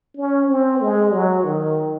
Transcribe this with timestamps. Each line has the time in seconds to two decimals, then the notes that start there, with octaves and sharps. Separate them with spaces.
0.17 C#4
0.49 C4
0.81 G#3
1.13 F#3
1.44 D#3